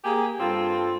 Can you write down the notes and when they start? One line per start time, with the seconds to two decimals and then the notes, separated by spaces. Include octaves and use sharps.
0.04 A#3 G4 G#4
0.40 G2 C4 F4 A4